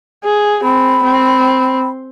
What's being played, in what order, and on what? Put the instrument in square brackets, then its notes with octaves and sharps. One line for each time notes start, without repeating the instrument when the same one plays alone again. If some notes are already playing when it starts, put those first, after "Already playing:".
[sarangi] G#4
[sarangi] C4 [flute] B5
[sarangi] C4